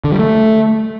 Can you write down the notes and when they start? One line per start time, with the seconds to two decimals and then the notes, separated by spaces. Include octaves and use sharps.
0.04 D3
0.12 G3
0.19 A3